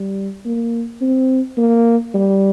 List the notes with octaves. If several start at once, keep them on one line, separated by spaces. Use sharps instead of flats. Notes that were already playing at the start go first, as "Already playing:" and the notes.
Already playing: G3
A#3
C4
A#3
G3